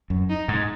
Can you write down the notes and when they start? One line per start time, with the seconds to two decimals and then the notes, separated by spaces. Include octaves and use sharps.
0.10 F#2
0.29 D#4
0.48 G#2